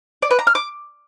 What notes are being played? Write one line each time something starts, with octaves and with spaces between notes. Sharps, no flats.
D5
B4
A#5
F6
D6